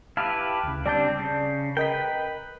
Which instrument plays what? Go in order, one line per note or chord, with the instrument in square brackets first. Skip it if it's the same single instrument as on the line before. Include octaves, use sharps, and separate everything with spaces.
[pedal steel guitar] E4 G4 B4 [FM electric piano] F5 A5 F6
[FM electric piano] D2 C#3
[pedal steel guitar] G3 C4 D4 [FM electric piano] D5 A5 G6
[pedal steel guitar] C#3
[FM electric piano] A#4 D#5 B6 [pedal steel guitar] B4 G5